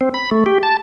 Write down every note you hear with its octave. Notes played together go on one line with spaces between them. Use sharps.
C4
B5
A3
G4
A5